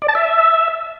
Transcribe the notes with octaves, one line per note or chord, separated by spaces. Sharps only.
D5
A5
E5